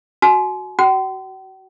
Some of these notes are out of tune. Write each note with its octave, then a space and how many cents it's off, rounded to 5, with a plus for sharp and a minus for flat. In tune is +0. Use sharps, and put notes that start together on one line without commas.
F#4 +0 G#5 +40
F#4 +30 G5 -45